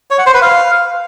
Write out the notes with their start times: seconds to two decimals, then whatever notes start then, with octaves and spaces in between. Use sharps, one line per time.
0.11 C#5
0.18 F#5
0.26 C5
0.34 B4
0.42 F5